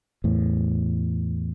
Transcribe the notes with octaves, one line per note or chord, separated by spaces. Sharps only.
E2 A2